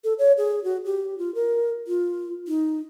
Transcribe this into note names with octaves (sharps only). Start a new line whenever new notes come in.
A4
C#5
G#4
F#4
G4
F4
A#4
F4
D#4